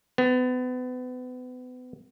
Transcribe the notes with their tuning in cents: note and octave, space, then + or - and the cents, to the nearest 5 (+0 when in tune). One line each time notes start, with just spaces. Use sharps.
B3 +30